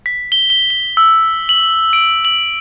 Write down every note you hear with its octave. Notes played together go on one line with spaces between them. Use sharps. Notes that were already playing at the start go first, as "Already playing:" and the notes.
B6
G7
G7
G7
E6
F#7
D7
F#7